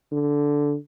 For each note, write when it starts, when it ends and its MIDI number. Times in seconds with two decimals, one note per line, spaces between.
0.12 0.75 50